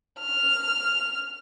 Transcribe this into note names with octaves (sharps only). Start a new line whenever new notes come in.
F6